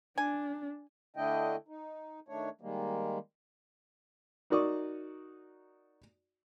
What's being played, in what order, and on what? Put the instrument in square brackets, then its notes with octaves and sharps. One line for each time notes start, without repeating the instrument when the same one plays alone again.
[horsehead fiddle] D4 [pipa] G#5
[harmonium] D3 A3 D4 E4 D#5 G5
D#4
D#3 A3 D4 C#5
D#3 G3 G#3 A#3
[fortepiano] D#4 F#4 A#4 D5 C#6 D#6